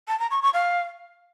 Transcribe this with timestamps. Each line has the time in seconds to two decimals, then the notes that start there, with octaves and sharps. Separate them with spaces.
0.08 A5
0.19 A#5
0.31 C#6
0.42 C#6
0.54 F5